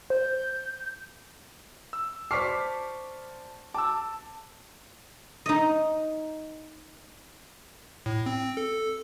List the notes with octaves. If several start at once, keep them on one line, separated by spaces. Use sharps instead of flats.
C5 G6
E6
C5 D5 A5 C#6 D6 F6 B6 C7
A5 D6 E6
D#4 D#5
A2
C4
A4